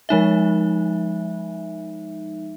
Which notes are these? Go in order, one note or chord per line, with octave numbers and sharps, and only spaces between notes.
F3 G#3 D#4 E5